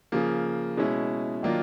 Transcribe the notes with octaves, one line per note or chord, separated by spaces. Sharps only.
C#3 F3 A#3
B2 G#3 C#4 E4
D#3 F#3 A#3 D4 F4